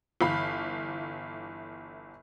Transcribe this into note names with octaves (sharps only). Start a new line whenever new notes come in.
G1 E3 F5 B5